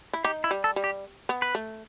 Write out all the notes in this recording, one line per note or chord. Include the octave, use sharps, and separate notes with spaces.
E4
D#4 G4
E4
G3
A4
G3
G4
B3
B4
A3